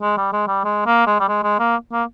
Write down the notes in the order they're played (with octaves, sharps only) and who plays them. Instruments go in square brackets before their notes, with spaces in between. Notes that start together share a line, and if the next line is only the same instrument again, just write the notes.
[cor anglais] G#3
G3
G#3
G3
G#3
A#3
G#3
G3
G#3
G#3
A#3
A#3